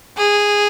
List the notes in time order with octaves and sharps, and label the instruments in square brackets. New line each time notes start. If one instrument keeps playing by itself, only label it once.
[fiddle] G#4